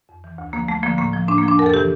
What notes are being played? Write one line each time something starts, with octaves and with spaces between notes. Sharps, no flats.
F2
E3
D2
D3 F3 A#3
D2 A3
D3 F3 A#3
A2 A#3
F3
A2 D4
A#3
F3
D4
F2 A#4
A4
C3 E3 G4